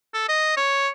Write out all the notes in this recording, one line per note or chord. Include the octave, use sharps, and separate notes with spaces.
A4
D#5
C#5